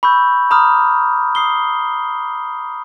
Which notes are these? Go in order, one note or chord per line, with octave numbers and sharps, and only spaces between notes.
B5 C#6 E6 G6
A#5 B5 D6 D#6 F6
D#6 C7 G7